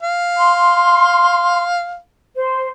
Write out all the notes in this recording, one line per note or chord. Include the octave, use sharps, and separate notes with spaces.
F5
C6
C5